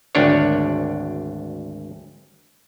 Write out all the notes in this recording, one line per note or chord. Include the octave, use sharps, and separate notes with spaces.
G#1 D2 D4 C#5